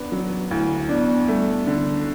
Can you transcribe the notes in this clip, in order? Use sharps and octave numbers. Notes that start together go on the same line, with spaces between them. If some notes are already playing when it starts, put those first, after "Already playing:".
Already playing: B3 D4
F#3
D2 E4
B3 D4
B3
G3 A3
D3